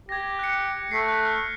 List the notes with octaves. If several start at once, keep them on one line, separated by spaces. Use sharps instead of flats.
G4 G#6 A#6
F#6 C#7
A3 F#6 B6 C7
F#6
F6